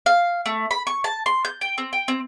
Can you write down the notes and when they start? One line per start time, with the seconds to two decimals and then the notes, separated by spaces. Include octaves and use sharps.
0.06 F5
0.46 A3
0.71 B5
0.87 C#6
1.04 A5
1.26 C6
1.45 G6
1.61 G5
1.78 C4
1.93 G5
2.08 C4